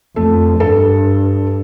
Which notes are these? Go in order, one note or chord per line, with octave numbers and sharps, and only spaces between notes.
F2 A3
G2 A4